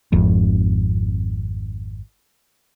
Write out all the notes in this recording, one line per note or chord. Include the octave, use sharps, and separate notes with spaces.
G#1 F2